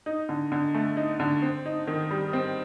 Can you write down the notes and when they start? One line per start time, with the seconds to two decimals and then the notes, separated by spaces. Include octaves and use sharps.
0.06 D#4
0.29 D3
0.52 D3
0.74 A3
0.97 D#4
1.20 D3
1.42 C4
1.66 D#4
1.87 D#3
2.11 G3
2.33 C4